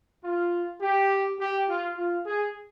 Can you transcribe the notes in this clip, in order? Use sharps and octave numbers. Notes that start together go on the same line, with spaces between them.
F4
G4
G4
F4
F4
G#4